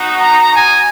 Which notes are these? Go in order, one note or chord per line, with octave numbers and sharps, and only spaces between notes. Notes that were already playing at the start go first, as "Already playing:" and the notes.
Already playing: B3 D#4 F#4
A#5
G#5